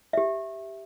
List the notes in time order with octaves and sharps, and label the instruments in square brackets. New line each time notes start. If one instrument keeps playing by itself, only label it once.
[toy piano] G4 E5